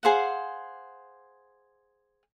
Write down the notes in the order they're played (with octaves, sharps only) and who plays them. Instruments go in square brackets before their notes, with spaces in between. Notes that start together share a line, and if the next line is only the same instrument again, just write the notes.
[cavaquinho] G#4 C5 F5 F#5